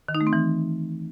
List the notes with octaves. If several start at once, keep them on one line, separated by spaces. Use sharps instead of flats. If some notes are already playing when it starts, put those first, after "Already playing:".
D#3
D#4
A3
C4
E3